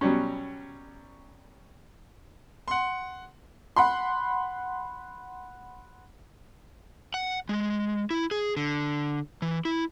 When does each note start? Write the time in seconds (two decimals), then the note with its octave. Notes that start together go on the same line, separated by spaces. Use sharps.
0.01 B2 F#3 G3 C#4
2.68 F#5 C6
3.76 F#5 B5 C6
7.14 F#5
7.49 G#3
8.10 E4
8.31 G#4
8.57 D3
9.42 E3
9.65 E4